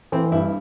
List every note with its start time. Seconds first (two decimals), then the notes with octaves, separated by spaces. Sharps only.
0.12 E3 C4
0.32 G2 E4